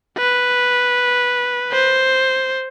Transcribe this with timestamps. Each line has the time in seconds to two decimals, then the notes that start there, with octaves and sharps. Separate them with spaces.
0.18 B4
1.72 C5